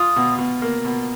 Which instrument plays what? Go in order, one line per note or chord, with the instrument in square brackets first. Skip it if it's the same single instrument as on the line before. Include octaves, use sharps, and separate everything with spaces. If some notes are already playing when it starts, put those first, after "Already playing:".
Already playing: [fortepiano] F4 [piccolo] D#6
[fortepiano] B2
B2
A#3
B2